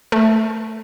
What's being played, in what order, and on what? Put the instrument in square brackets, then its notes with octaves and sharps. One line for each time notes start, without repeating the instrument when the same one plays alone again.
[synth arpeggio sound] A3